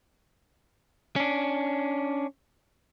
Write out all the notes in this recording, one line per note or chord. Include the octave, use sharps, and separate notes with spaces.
C#4 D4